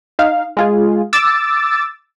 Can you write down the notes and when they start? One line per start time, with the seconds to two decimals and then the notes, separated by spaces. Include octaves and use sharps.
0.19 D#4 F5
0.57 G#3 F4 G#4
1.13 D6 E6 A6